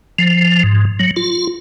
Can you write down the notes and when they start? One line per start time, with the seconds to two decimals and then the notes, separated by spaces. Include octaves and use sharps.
0.19 F3
0.63 G#2
0.99 F#3
1.16 F4